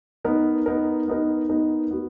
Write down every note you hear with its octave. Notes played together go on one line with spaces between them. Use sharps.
B3 D#4 A#4
B3 D#4 A#4
B3 D#4 A#4
B3 D#4 A#4
B3 F#4